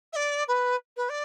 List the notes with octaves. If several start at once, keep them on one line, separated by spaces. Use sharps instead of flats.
E5
D5
B4
B4
D5